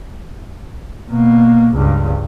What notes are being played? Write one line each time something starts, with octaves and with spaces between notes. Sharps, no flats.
B2 A#3
C#2 G2